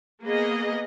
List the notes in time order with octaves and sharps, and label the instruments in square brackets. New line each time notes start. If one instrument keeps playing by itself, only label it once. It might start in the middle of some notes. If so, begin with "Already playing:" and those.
[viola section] A#3 B3 G#4 D#5